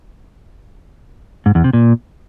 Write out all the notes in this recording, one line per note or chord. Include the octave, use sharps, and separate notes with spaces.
G#2
E2
C3
A#2